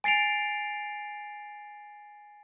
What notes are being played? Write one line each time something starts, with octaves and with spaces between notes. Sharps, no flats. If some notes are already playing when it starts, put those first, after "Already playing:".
G#5 A6 C7 D7 F7